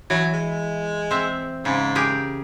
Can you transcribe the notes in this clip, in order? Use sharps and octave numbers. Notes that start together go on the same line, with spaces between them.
E3 F#3
G#3
C4 E5
G#2 C#3
G4 G#4 A#4